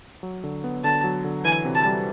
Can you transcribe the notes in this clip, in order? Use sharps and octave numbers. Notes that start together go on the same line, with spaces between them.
F#3
D3
B3
D3 A5
F#3
D3
E3 G#5
C3
A5
G3